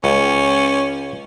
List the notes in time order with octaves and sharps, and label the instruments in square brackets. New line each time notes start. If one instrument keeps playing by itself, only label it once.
[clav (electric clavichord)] C#2 [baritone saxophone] C#4